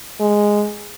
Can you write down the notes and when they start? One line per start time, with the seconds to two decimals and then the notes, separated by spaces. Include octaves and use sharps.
0.21 G#3